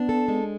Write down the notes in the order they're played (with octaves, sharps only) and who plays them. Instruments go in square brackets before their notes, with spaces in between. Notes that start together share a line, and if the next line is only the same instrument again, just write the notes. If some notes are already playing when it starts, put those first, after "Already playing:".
Already playing: [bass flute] B3 [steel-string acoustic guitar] D4
[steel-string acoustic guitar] A4
G#3